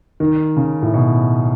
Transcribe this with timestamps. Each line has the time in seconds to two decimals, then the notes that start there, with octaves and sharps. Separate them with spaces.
0.20 D#3
0.57 C#3
0.82 A2
0.94 B2